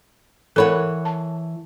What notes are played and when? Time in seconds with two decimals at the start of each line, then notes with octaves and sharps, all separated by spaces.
0.56 E3 A4 A#4 C#5 F#5 B5
1.05 A5